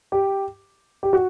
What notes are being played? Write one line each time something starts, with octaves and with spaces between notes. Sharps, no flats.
G4
G4
F#4